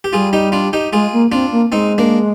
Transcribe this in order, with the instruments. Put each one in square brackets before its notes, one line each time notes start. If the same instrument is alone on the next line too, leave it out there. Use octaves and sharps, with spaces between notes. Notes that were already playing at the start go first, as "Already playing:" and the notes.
[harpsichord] G4
[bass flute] G3 [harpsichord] F4 G#4
[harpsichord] D#4 G4
D4 F4
D#4 G4
[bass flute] G#3 [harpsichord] F4 G#4
[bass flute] A#3
[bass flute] C4 [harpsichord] D4 F4
[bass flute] A#3
[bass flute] G#3 [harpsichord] C4 D#4
[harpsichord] A#3 D4